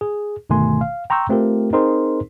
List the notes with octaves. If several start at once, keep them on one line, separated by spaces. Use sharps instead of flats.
G#4
G1 B2 D#3 A3 G#5 C6
F5
G5 A#5 C6 C#6 E6 G6
A3 C4 F4 G4 A#4
C4 D#4 G#4 A#4 C5 C6